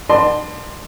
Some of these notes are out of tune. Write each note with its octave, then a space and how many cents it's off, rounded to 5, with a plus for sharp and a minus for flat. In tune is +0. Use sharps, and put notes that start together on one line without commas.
D5 +40 A5 -10 C6 +0